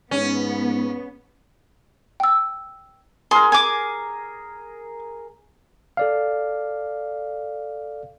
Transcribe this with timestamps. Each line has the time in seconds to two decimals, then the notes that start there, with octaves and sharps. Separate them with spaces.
0.11 G#2 B3 C#4
2.20 G5 E6
3.31 G#4 A#4 C6
3.52 G#5 D6
5.97 A4 D5 F5